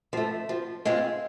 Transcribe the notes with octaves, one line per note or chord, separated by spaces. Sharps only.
F3 A3
F3
G#3 C4 F4